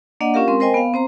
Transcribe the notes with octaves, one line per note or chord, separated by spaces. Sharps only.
A#3 D4 D5 D#5 F#5
C#4 F4 G4 A#4 F5
G#3 C4 A#4 C6
A#4 C5 D#5 G5 G#5
B3 F5
C4 C5 A#5